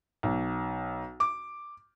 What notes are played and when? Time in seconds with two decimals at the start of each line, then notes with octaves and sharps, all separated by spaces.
0.23 B1
1.20 D6